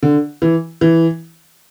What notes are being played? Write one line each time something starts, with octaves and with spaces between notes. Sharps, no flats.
D3
E3
E3